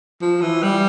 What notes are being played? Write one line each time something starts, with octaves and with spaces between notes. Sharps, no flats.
F3
E3
G3